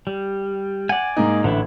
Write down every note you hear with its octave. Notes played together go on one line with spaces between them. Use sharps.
G3
D5 F#5 G#5
G#2 A#3 D#4
A1 D3 D4 E4